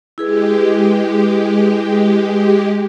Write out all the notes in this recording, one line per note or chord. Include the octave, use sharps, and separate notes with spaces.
G#3 E4 G4 G#4 B4